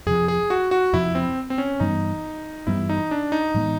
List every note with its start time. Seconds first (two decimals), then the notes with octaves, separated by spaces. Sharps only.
0.06 F2 C3 F3 G#4
0.28 G#4
0.50 F#4
0.71 F#4
0.93 F2 C3 F3 E4
1.15 C4
1.50 C4
1.58 C#4
1.80 G2 E3 G3 B3 D#4
2.67 G2 E3 G3 B3 E4
2.89 D#4
3.11 D4
3.32 D#4
3.54 A2 E3 G#3 B3